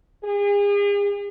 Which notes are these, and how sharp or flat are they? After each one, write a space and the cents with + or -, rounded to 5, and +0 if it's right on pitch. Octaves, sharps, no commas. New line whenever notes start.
G#4 -40